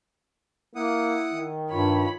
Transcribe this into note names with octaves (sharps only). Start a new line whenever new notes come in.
A#3 E4 F#5 D#6
D#3
G2 F4 C#5 B5